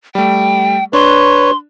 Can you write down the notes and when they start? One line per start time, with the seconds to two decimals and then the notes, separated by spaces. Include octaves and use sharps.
0.15 G3 A3 G5
0.93 D4 B4 C#5 C6